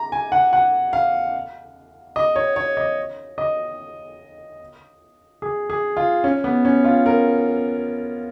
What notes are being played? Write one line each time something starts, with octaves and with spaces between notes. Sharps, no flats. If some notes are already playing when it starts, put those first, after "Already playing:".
Already playing: A#5
G#5
F#5
F#5
F5
D#5
C#5
C#5
D#5
D#5
G#4
G#4
F4
C#4
B3
C#4
F4
A#4